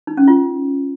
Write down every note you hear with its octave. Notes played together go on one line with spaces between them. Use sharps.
D#4
C#4
F4